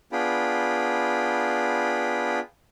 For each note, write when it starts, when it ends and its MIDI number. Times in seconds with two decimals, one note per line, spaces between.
0.12 2.39 59
0.12 2.39 62
0.12 2.39 65
0.12 2.39 68
0.12 2.39 79
0.12 2.39 83